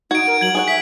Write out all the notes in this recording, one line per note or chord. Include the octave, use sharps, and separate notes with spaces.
D#4 F#4 G#6 D7
A#4
F#3 G#6 F#7
D#4 G#4 C#5 F#5
E5 B6